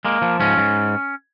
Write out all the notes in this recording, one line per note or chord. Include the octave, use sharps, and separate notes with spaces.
G#3 A#3
F3
G#2 C#4
G#2